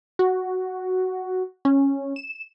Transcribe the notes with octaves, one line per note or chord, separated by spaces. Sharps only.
F#4
C#4
E7